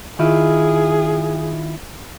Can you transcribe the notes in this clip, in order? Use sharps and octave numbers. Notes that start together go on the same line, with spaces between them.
D#3 E4 F4 G#4